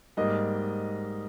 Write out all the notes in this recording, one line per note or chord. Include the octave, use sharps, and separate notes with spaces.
G#2 G3 A#3 D#5